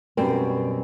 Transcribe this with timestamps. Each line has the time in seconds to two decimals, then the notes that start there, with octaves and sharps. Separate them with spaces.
0.17 F#2 B2 G3 C4